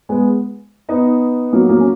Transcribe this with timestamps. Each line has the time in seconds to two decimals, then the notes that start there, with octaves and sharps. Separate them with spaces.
0.09 G#3 B3
0.89 B3 D#4
1.53 F#3 A#3
1.69 F#3 A#3
1.80 C#4